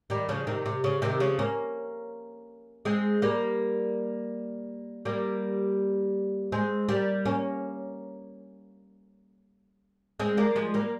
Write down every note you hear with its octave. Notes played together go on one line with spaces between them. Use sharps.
D#3 G3
C#3 F3
C3 D#3
C3
C#3
C3 D#3
C#3 F3
A#3 C#4
G#3 C4
G3 A#3
G3 A#3
G#3 C4
G3 A#3
A#3 C#4
G#3 C4
G3 A#3
F3 G#3
G3 A#3